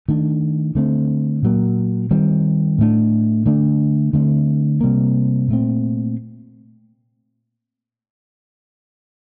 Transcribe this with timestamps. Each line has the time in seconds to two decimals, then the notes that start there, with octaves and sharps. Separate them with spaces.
0.09 D#3 A3 D4
0.75 D3 A3 C4
1.43 A#2 F#3 A#3
2.11 D#3 G3 C4
2.78 A2 A3 D4
3.46 D3 A3 D4
4.13 D3 A3 C4
4.81 C3 G3 A#3
5.48 A#2 A3 C4